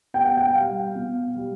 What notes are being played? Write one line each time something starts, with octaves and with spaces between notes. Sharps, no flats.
B2 G5
F#5
G5
G3 F5
B2
G3